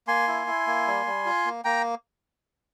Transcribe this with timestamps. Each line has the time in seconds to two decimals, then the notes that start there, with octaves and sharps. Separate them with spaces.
0.07 A#3 G#5 C6
0.28 E4
0.47 E4
0.67 A#3
0.87 G3
1.06 G3
1.26 F4
1.46 A#3
1.65 A#3 G5 A#5